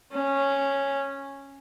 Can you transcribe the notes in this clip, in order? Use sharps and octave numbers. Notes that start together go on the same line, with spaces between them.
C#4